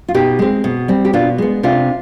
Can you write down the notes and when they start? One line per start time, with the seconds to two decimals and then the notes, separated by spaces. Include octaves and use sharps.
0.08 F4
0.14 B2 D#4 G4
0.39 G#3 C4
0.64 B2
0.88 G3 C4
1.05 G4
1.13 B2 D4 F4
1.38 G#3 B3
1.63 C3 D4 F4